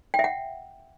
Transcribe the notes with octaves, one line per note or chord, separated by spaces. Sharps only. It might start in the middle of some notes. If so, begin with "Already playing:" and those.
G5
E5
F#5